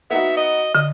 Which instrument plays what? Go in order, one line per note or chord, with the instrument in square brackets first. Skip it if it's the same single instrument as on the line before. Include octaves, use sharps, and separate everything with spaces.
[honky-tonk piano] B3 D#4 F#4 [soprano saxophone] E5
[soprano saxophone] D#5
[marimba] D3 [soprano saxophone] D#5